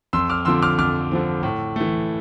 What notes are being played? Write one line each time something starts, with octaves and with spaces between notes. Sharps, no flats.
F2 C6 E6
D6 F6
D3 F3 C4 C6 E6
D6 F6
F2 D6 F6
D3 F3 C4
A2
E3 A3